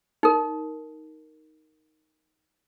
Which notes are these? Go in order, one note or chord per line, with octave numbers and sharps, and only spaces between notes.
D#4 A#4